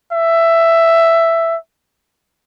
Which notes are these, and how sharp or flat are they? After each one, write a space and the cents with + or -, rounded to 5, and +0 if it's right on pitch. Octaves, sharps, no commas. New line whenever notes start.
E5 +10